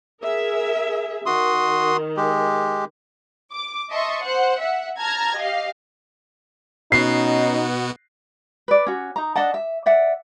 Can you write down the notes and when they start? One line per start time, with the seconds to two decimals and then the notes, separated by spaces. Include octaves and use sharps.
0.23 G#4 A#4 E5
1.26 D#3 F#4 C6 D#6
2.17 G#3 G4
3.52 D6
3.91 D#5 E5 A5 C6 C#6 D#6
4.22 C5 F#5
4.59 E5 F#5
4.99 A5 A#5 F6 G#6 A#6
5.35 G4 D#5 F5
6.92 B2 B3 C#4 D#4 F#4 C7
8.68 B4 D5
8.86 C#4 F#4
9.16 D#4 A#5
9.36 D4 D#5 F#5 A5
9.54 E5
9.86 D5 E5 F#5